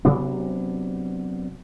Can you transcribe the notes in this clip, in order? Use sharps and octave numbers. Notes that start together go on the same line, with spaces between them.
C3 F#3 B3 D4